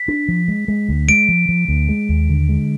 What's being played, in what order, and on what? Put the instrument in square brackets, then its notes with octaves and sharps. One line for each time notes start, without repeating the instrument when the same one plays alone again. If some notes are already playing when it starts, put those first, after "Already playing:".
Already playing: [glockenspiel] B6
[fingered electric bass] D4
F3
G#3
G#3
D2
[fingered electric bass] G#3 [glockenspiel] D7
[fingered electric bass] F3
F3
D2
G#3
D#2
D3
G#3